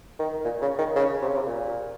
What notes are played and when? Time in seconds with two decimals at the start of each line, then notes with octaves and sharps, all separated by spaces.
0.19 D#3
0.44 A#2
0.62 C#3
0.79 D#3
0.96 C#3
1.22 C3
1.28 C#3
1.36 C3
1.47 A#2